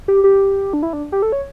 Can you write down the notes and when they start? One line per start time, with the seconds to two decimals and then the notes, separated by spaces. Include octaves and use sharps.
0.08 G4
0.24 G4
0.73 D4
0.83 E4
0.93 D4
1.12 G4
1.22 A4
1.32 C#5